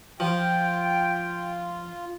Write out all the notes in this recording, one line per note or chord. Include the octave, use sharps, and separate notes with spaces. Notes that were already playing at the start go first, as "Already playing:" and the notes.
F3 F4 G5